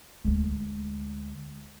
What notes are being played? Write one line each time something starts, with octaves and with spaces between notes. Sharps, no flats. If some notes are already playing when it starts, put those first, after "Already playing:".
D2 G#3